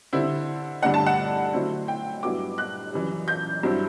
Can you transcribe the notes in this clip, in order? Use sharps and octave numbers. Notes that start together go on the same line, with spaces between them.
D3 G3 C4 E4
G2 D3 A3 D4 F#5
A5
F#5
D3 F#3 A3 C4 E4
G5
G2 F#3 B3 E4 D6
F#6
F#2 E3 G3
G6
G2 F#3 C4 E4